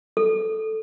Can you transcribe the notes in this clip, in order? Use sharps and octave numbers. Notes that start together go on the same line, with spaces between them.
A4